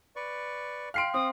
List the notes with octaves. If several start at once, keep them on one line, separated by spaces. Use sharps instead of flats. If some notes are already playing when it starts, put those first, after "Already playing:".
B4 D5 C#6
F5 G5 C6 F6 C7 D7
C4 D#6